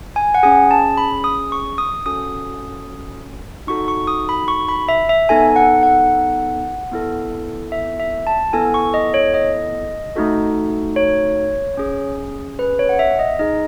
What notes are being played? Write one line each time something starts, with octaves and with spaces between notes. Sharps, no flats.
G#5
F#5
C#4 G#4 G#5
A5
B5
D#6
C#6
D#6
C#4 F#4 A4 D#6
D#4 F#4 A4 C#6
C#6
D#6
B5
C#6
B5
E5
E5
B3 D#4 A4 G#5
F#5
F#5
B3 E4 A4
E5
E5
A5
B3 E4 A4 G#5
C#6
D#5
C#5
D#5
A3 D#4 F#4 A4
C#5
C#4 G#4
B4
C#5
F#5
E5
D#5
D#4 G#4 D#5